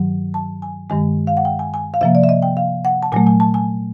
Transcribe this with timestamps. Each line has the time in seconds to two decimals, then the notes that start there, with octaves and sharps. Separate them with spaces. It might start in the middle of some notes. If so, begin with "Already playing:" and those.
Already playing: G2 D#3 F#3
0.34 A5
0.62 G#5
0.90 G2 D#3 G#3 G#5
1.27 F5
1.37 F#5
1.45 G5
1.59 G#5
1.74 G#5
1.94 F5
2.01 C3 F3 A#3 E5
2.15 D5
2.24 E5
2.29 D#5
2.43 G5
2.57 F5
2.85 F#5
3.03 A5
3.12 A#2 F#3 A3 G#5
3.27 G#5
3.40 A5
3.54 G#5